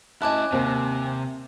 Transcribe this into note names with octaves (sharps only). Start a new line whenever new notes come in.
C#4 E4 D#5 G#5 A5 D6 F#6
D#2 C3 C4